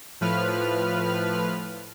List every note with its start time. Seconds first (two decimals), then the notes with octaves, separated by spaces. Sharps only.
0.21 A2 F3 B4 F6